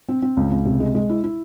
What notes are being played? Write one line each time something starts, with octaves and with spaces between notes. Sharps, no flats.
C4
C4
C#2
C#2
C3
G#3
G#3
E4
E4